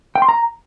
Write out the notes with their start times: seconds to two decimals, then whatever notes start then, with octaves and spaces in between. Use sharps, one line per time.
0.15 G5
0.22 C6
0.29 A#5